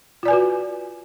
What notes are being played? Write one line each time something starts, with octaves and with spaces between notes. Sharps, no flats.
F4 F#4 B4 D5 G#5